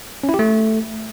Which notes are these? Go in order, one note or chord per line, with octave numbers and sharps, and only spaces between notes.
C#4
E4
G4
A3